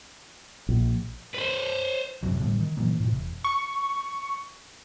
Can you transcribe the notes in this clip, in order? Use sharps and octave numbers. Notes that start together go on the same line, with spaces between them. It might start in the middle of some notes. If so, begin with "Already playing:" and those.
A#1
B4 C5
G#1 F#2 C3 F#3
A2 D3 G3 B3
D#3
A#2 E3 F#3 A#3
A2 C3
E1
C#6